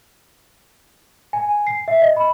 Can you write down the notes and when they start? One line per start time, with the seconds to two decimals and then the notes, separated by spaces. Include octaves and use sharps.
1.33 G#5
1.67 C7
1.88 E5
2.02 D#5
2.17 B5